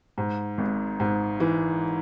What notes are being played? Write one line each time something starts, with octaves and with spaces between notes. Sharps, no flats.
G#2
G#1
G#2
E3